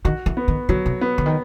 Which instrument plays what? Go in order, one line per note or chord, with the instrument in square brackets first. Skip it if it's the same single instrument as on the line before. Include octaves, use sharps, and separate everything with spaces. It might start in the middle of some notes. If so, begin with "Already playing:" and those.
[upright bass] D#3 [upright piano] F#4
[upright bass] E3
[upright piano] B3
[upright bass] D#3
[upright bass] D3 [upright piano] F#3
[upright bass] C3
[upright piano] B3
[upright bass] D3
D#3